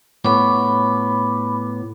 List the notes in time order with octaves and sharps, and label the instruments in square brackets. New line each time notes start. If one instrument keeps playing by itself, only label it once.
[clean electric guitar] A2 B3 C#5 [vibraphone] B5 D6